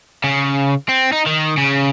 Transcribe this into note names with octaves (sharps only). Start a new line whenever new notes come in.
C#3
C4
D#4
D#3
C#3